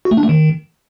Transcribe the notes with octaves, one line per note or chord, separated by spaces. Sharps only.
F#4
A3
D4
A3
D#3